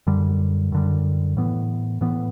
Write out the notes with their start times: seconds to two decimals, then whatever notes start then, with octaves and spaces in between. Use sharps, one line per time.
0.07 F#2 D3 G3
0.72 F#2 D3 G3
1.37 A2 E3 B3
2.01 A2 E3 B3